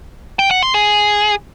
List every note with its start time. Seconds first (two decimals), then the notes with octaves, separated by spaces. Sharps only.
0.39 G5
0.51 F#5
0.63 C6
0.74 G#4